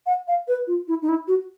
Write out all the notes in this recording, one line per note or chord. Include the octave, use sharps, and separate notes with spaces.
F#5
F5
B4
F4
E4
D#4
E4
F#4